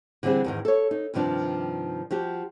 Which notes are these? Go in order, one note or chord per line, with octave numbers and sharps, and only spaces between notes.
D3 E3 G3 C4 G#4
E2 G#2 D#3
A4 C#5
D#4
G2 C3 D#3 F3 D4
F3 F#4 G4